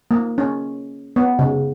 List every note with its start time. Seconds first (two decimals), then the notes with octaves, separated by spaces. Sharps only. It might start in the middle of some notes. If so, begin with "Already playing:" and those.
0.11 A#3
0.38 C#4
1.16 B3
1.39 C#3